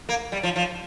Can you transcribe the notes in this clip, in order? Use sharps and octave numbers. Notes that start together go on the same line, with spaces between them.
A#3
G3
F3
F3